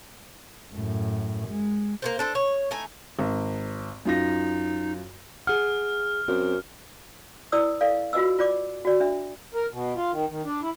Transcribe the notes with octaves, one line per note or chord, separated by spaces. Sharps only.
F#2 A2
G#3
A#3 B3 C5
D4 A4 C5
C#5
A3 D#4 G#5
G#1
F#2 D#4 F4 A#6
G#4 F#5 F6
F#2 C4
E4 B4 D5 D#6 E6
A4 D5 F5
F4 F#4 B4 D#5 E6
F4 D5 D6
F#4 D5
D4 E5
A#4
B2
F4
D#3
D#3
D4
E4